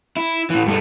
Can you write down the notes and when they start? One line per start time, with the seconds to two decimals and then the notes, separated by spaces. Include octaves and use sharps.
0.17 E4
0.50 A2 E3
0.66 G2 A3